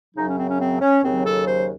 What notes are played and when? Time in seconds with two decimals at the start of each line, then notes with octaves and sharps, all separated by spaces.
0.15 F#2 C#3 F#3 D#4
0.26 C#4
0.37 C4
0.47 C#4
0.59 C4
0.80 C#4
1.02 D#2 C#3 F#3 C4
1.24 A4
1.46 C5